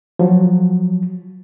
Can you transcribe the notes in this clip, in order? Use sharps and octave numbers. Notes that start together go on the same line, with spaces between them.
F3 F#3